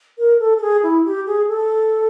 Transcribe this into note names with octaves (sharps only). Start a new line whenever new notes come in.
A#4
A4
A4
G#4
E4
G4
G#4
A4